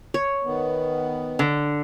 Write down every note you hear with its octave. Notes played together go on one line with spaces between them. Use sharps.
C#5
D#3 B3
D3